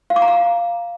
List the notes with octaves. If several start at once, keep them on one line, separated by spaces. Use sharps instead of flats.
F5
D6
A#5
F5